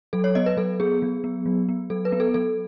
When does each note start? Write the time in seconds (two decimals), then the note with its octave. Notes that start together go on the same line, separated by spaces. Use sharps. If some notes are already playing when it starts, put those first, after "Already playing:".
0.13 F#3 A4
0.24 C#5
0.35 B3 D#5
0.46 B4
0.57 F#3 A4
0.80 B3 G#4
1.02 F#3
1.24 B3
1.46 F#3
1.69 B3
1.90 F#3 A4
2.05 B4
2.12 B3
2.20 A4
2.34 F#3 A4